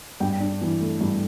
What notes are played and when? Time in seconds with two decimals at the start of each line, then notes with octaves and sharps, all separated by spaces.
0.20 G2 G5
0.40 D4
0.61 E3
0.81 A3
1.01 G2